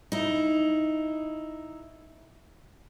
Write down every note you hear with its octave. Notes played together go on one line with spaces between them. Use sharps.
D#4 E4